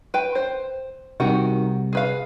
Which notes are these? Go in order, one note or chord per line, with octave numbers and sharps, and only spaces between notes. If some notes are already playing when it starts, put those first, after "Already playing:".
B4 G5
C5
C3 D#3 G3 F#4
G#4 B4 F5